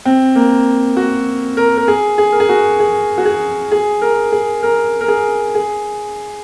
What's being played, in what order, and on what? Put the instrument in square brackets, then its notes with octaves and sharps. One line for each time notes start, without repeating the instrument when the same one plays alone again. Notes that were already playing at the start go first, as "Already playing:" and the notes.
[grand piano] C4
A#3
F#4
A#4
A#4
G#4
G#4
A#4
G#4
F#4
G#4
F#4
G#4
G#4
A#4
G#4
A#4
A#4
G#4
G#4